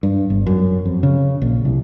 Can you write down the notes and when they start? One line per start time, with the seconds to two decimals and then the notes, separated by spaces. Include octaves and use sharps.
0.03 G2
0.30 G1
0.47 F#2
0.85 F2
1.03 C#3
1.42 A#1
1.65 C2